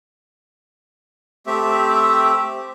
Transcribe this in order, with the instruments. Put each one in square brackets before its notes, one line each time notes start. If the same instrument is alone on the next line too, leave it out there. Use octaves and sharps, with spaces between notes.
[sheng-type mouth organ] A3 C4 G4 E5